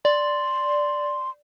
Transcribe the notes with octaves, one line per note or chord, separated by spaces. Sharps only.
D5 C6